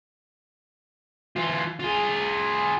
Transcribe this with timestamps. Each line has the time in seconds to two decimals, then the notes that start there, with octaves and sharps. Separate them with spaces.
1.36 E3 F4
1.80 F4 G#4